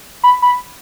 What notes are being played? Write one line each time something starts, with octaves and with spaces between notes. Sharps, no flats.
B5
B5